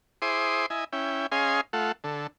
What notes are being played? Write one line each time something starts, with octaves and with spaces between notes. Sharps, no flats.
E4 G#4 C5 C6 D6 D#6
E4 D#5 G#5
C#4 E4 G5
C#4 G#4 D#5 F5 G#5 C6
A3 F4 A4 F#5
D3 A4